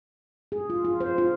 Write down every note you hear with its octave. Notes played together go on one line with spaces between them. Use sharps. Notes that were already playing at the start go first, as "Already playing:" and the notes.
G#4
F4
F4
C5
F4